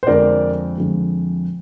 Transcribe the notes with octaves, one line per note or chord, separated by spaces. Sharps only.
C5
F2 D3 F3 G#3 A#4 D5
F2 D3 F3 G#3